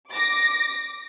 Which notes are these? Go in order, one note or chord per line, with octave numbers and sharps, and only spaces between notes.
D6 A#6